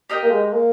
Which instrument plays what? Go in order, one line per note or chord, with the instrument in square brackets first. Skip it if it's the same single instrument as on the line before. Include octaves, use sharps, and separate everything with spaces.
[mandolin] G4 A#4 D#5 G5
[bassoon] A#3
G#3
A#3